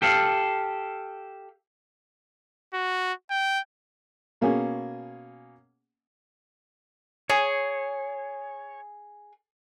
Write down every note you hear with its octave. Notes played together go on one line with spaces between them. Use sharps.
G4 A4 F5
F#4
G5
B2 A#3 C#4 G#4
G#4 C#5